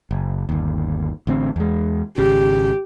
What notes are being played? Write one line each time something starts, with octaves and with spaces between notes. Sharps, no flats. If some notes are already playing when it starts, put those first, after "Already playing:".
F#1
G1 D#2
A1 D3 C4
E2 G#3
G#1 C#3 G4